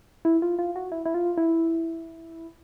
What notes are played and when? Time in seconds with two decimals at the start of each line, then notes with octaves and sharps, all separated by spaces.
0.25 E4
0.42 F4
0.59 F4
0.76 F#4
0.92 E4
1.06 E4
1.14 F4
1.37 E4